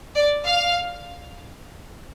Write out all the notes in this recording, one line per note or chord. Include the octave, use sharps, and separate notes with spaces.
D5
F5